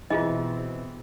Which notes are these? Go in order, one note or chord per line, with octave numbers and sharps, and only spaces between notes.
B2 E3 C4 F4 G#4 D#5